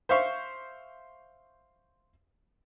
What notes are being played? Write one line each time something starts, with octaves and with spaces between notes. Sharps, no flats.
C5 E5 F5 C#6